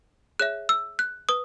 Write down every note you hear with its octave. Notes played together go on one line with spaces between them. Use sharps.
G#4 C#5 E5 F#6
E6
F#6
B4 D#6